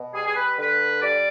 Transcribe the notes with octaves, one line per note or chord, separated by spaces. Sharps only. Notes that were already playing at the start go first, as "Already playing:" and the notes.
Already playing: B2
G3 G#4
G#4
B4
D3 B4
G3 D5